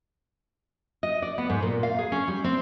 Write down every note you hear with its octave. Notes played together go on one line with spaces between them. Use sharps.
D#5
D5
B3
G#2
A#2
F5
G#4
C#4
G3
C4